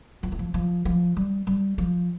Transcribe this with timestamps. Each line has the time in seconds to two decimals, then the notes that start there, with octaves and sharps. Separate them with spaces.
0.23 F3
0.32 E3
0.39 F3
0.54 F3
0.85 F3
1.17 G3
1.47 G3
1.78 F3